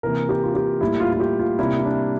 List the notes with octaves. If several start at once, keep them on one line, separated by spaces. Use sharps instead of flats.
C3 E3 A#3 A#4
G4
F4
G4
A2 G3 A#3 E4
F4
F4
G4
F4
C3 G3 A#3 E4
E4
D4